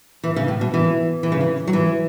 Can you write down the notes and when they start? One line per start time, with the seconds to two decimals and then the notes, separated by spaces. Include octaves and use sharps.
0.24 E3
0.36 C#3
0.48 A2
0.61 B2
0.74 E3
1.23 E3
1.32 C#3
1.41 E3
1.67 F#3
1.73 E3